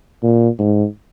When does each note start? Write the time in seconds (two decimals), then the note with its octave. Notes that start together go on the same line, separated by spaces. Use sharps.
0.23 A#2
0.59 G#2